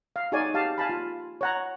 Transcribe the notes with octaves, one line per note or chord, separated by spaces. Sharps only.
F5
D#4 F#4 G#4 C#5 D5 G#5
G4 F5 A5
F5 G#5 A5 B5
F4
C#5 F#5 A#5